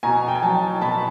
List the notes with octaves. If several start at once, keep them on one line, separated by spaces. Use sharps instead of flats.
B2 G#5 A#5
G5
G#5
F#3 G5 A5
B2 A5 B5